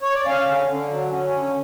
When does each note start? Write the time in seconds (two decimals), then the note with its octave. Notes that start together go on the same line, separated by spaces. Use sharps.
0.02 C#5
0.14 D5
0.26 C#4 F5
0.47 D3
0.68 D3
0.89 F#3
1.10 C#4
1.31 D3